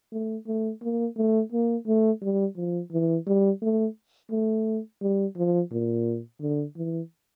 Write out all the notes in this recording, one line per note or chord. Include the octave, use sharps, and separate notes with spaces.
A3
A3
A#3
A3
A#3
A3
G3
F3
E3
G3
A3
A3
G3
F3
A#2
D3
E3